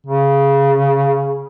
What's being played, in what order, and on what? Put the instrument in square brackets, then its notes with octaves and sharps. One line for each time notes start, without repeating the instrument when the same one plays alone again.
[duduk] C#3